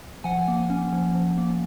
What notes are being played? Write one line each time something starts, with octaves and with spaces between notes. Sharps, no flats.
F3 F#5 G#5
A#3
C#4
F3
F3
A#3